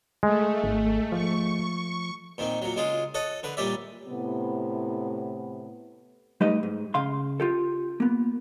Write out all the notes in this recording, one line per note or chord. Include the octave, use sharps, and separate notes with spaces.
G#3 A3
G#1
F3 C#6
A#2 D#3 C4
A#2 F#3
C#3 G#3 F4 G#4
A4 C#5 D#5 F#5
D3 B4
A#2 G3 C#4 D5 E5
A2 C3 B3
G3 A3 D#4 G4 B4 D#5
G#2
C#3 F5 C6
F4 G4 A4
A#3 B3